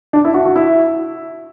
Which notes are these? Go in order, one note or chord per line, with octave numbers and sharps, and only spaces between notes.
D4
E4
F#4
F#4
E4